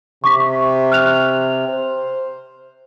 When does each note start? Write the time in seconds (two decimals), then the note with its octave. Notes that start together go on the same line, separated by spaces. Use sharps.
0.24 C3 C#6 D6 B6
0.92 F6 F#6 F7
1.69 C5